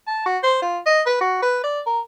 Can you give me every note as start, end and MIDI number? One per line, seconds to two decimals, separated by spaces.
0.07 0.24 81
0.26 0.38 66
0.43 0.61 72
0.62 0.79 65
0.86 1.01 75
1.06 1.21 71
1.21 1.40 66
1.42 1.59 71
1.64 1.81 74
1.86 2.00 70